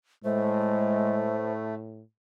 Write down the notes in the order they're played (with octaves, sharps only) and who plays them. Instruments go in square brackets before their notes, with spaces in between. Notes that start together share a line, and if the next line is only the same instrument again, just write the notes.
[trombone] A2 [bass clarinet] G#3 [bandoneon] A3 [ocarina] C5